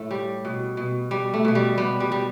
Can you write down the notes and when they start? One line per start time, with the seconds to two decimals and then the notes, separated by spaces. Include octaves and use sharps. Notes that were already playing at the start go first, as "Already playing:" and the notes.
Already playing: A2 A3
0.11 G3
0.45 B2
0.77 B2
1.11 B2 G3
1.34 A3
1.45 B2 A3
1.55 G3
1.78 G3 B3
2.00 G3
2.12 G3